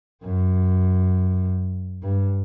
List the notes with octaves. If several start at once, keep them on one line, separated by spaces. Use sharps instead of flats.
F#2
G2